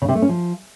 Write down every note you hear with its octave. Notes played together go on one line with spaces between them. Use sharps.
C#3
C3
A3
C#4
F3